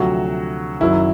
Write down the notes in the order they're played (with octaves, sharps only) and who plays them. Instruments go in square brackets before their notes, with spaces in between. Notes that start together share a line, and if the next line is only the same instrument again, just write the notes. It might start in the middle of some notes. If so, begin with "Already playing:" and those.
Already playing: [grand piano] D2 C3 F3 F#3 F#4
F#1 F#2 D#3 F#3 E4